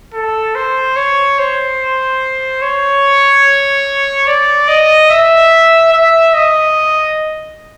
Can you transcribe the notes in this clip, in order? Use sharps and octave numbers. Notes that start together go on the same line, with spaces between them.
A4
C5
C#5
C5
C#5
D5
D#5
E5
E5
D#5